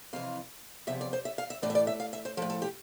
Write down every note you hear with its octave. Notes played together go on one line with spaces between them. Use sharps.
F2 C3 E3 F5
E2 C3 F3 E5
D5
C5
E5
F5
E5
A2 E3 D5
E5
D5
E5
F5
E5
C5
A2 F3 A4
A4
G4